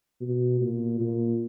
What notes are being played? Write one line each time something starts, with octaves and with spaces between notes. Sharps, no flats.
B2
A#2
A#2